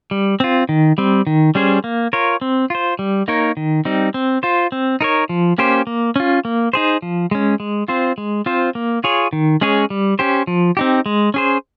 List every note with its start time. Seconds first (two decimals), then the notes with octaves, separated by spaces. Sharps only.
0.11 G3
0.40 C4 F4
0.69 D#3
0.98 G3 C4
1.27 D#3
1.55 G3 C#4 G#4 C5
1.84 A#3
2.13 F4 A#4 C#5
2.41 C4
2.70 F4 C5
2.99 G3
3.28 A#3 D#4 A#4 C#5
3.57 D#3
3.85 G3 C4 D#4
4.14 C4
4.43 F4 C5
4.72 C4
5.01 D#4 A#4 C#5
5.29 F3
5.58 A#3 C#4 G4 C5
5.87 A#3
6.16 C#4 F4
6.45 A#3
6.73 D#4 G#4 C5
7.02 F3
7.31 G#3 C#4
7.60 G#3
7.88 C4 F4 C5
8.18 G#3
8.46 C4 F4 C5
8.75 A#3
9.04 F4 G#4 C#5
9.33 D#3
9.61 G#3 C#4 G#4 C#5
9.90 G3
10.19 C#4 G4 C5
10.47 F3
10.77 C4 D#4 G4
11.06 G#3
11.34 C#4 G#4 C5